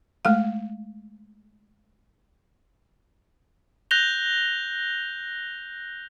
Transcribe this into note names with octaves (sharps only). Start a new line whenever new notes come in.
G#3 A3 F5
F#6 G6 A#6 F7 G7